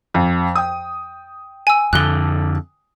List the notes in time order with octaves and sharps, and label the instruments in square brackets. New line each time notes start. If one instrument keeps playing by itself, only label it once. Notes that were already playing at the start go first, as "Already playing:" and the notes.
[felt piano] F2
G5 D#6
[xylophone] G#5 E6
[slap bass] F2 D3 [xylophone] F#6 G7